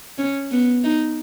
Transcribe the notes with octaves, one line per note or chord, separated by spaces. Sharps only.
C#4
B3
D#4